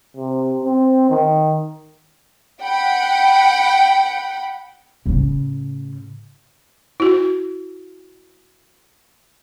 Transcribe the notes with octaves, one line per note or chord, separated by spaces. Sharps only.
C3
C4
D#3
F#5 G5 B5
A2 C#3
E4 F#4